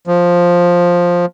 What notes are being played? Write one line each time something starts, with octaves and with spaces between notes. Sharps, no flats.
F3